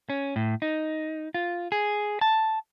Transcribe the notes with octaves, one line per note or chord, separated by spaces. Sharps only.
C#4
A2
D#4
F4
G#4
A5